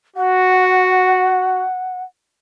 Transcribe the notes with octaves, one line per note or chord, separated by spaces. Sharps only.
F#4 F#5